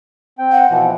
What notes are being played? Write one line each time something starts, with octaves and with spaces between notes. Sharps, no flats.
C4 G5
F#5
B2 E3 F3